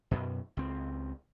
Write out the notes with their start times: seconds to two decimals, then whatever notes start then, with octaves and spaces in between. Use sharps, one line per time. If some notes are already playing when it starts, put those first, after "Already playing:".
0.11 F#2 B2
0.57 C#2 C4